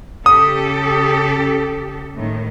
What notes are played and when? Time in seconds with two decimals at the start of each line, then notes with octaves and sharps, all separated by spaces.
0.26 C#3 G4 A4 D#6
2.17 A2 D#3